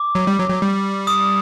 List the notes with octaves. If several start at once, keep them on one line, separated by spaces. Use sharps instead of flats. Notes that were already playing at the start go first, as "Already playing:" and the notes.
Already playing: D6
F#3
G3
F#3
F#3
G3
D#6